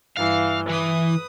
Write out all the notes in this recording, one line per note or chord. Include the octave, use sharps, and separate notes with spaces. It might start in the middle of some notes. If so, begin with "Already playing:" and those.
G2 E3 F5
E3 B4 D#6